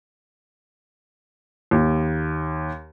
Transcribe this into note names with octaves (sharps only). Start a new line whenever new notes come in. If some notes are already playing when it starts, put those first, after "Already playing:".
D#2